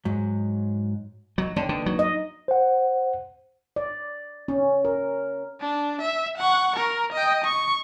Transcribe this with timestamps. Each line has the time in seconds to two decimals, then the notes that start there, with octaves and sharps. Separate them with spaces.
0.05 G#2 F#3
1.38 F#3 D#5
1.56 D3 D4 C#5 D#5 G5
1.69 D3 A#3 D#4 B4
1.86 F#3
1.99 D#4 D#5
2.48 C5 F#5
3.76 D5
4.48 C#4
4.85 A#4
5.60 D4
6.01 E5
6.38 F#5 C#6
6.76 A#4
7.13 D#5 G5
7.44 C#6